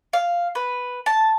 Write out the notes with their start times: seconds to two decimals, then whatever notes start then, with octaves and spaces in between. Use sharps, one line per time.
0.13 F5
0.55 B4
1.06 A5